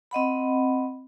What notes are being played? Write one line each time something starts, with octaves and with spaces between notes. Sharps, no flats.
C4 D#5 F#5 B5